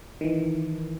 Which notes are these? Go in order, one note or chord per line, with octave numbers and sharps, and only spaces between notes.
D#3 E3